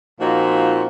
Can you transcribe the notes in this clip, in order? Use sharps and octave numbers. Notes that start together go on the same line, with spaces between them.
A#2 F3 A#3 C4 D#4 F#4